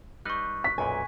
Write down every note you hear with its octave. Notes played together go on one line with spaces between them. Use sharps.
G3 D#4 B4 C#6 F#6
B6
B1 F#2 A#2 G#5